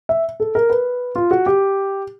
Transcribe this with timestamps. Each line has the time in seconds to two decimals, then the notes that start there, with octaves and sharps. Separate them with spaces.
0.09 E5
0.40 A4
0.55 A#4
0.70 B4
1.16 F4
1.31 F#4
1.46 G4